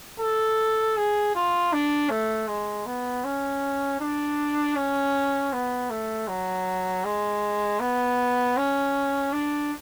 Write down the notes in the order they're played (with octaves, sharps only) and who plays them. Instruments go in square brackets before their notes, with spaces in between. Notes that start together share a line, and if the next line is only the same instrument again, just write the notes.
[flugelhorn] A4
G#4
F4
D4
A3
G#3
B3
C#4
D4
C#4
B3
A3
F#3
G#3
B3
C#4
D4